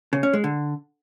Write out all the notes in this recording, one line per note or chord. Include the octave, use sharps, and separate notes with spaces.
C#3
C#4
G#3
D3